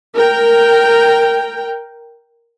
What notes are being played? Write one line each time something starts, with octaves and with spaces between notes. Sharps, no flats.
A#4 G5